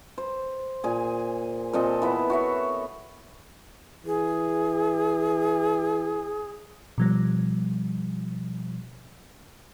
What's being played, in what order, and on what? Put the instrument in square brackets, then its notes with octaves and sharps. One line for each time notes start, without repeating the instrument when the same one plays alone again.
[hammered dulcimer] C5
A#2 G#4 G#5
A#2 C4 A4 D#5
E3 B3 E5
F#4 C#5 E5
[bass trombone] E3 [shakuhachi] G#4
[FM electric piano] B2 F3 G3